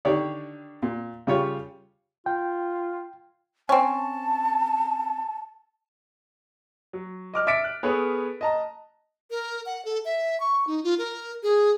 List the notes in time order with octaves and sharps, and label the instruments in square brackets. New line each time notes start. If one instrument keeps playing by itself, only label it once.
[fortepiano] D3 D#3 D4 G4 C#5 D5
A#2
C#3 G3 F4 G4 C#5
[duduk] F4 [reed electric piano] G5
[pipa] C4 C#4 [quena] A5
[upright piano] F#3
D#5 D6 F6
E5 D6 A6 B6 D7
F#6
B3 G#4 A4 B4 C#5
D#5 A5 A#5
[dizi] A#4
F#5
A4
E5
C#6
D#4
F4
A#4
G#4